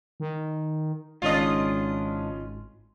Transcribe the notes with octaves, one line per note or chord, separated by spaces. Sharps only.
D#3
G#1 G#2 C#3 C#4 D4 F4 D#5 C#6